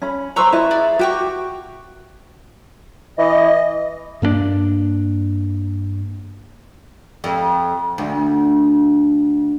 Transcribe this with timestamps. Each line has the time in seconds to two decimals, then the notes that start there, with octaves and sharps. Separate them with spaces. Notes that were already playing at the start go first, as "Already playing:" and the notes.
0.02 C#4 B5
0.36 B4 C5 A#5 B5 C#6 E6
0.52 E4 B4 D#5 A5
0.71 G#4 D5
0.99 F#4 G4 G5 C#6
3.18 E3 D#5
4.22 G2 A#3 B3 D4
7.24 F2
7.98 D2